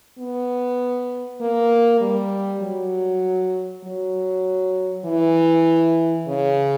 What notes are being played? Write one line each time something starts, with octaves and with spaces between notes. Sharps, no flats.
B3
A#3
G3
F#3
F#3
E3
C#3